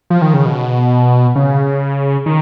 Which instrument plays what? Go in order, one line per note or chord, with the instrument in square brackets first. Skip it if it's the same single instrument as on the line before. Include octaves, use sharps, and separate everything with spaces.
[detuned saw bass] F3
D#3
C#3
B2
C#3
D#3